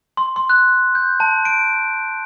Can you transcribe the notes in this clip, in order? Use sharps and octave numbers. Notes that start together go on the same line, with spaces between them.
C6
C6
F#6
G6
A5
D7